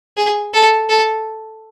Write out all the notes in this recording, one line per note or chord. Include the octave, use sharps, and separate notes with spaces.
G#4
A4
A4